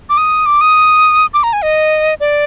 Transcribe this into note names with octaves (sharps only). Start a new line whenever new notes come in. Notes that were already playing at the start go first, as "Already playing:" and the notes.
D6
D#6
D6
D#6
D6
A#5
G#5
D#5
D5